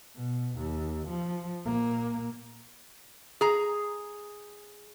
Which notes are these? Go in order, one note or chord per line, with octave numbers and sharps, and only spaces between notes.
B2
D#2
F3
A#2 A#3
G#4 A#5